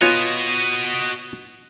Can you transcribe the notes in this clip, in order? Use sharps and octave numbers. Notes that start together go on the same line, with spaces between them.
B3 F4 F#4 C#5 D#5 G#5